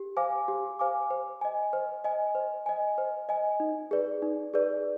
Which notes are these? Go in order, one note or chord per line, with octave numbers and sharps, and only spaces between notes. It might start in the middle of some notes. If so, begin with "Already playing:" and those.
Already playing: G4
C5 F5 G#5 D6
G4
C5 F5 G#5 D6
C5
D#5 G#5
C5
D#5 G#5
C5
D#5 G#5
C5
D#5 G#5
D#4
G#4 B4 D5
D#4
G#4 B4 D5